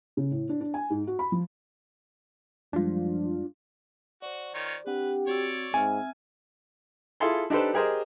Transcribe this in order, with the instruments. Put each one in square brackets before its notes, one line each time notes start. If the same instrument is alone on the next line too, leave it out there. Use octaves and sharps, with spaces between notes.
[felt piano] C#3
A2
D4
D4
G#5
G#2
F#4
B5
F3
[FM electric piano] F#2 G3 G#3 [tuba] F3 [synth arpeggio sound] D4 F4
[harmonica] F#4 [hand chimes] C5 D5
[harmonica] D#3 F4 C#5
[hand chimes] C4 D4 F#5 [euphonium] G4 [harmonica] B4
[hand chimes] C4 F#4 E6 [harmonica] C#5 D5
[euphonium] G#2 [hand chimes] C4 E5 F6 [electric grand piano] G#5
[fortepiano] E4 F4 G#4 A4 C6
D4 D#4 G4 A4 B4 C5
G4 G#4 A#4 C5 D#5